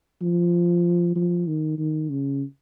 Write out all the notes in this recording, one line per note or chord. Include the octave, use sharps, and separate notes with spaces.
F3
F3
D#3
D#3
C#3